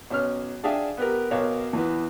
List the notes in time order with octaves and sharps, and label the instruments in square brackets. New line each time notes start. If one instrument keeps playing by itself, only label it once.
[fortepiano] B1 C#4 F6
D4 G#4 E5 F5 G5
B3 G4 A#4
B1 A#4 C#5 F5
E2 E3 B3